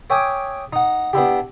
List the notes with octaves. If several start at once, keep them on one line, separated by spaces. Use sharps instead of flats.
C#5 E5 G5 G#5 D6 D#6
D#4 F#5
B3 D4 E4 G4